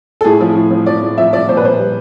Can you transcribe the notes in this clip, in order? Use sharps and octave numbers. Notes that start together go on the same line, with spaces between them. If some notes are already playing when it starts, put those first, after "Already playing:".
A4
A2 G#4
F3
A2
F3
F3 D5
A2
F3 E5
F3 D5
A#2 C5
B4
A#2 C5
G3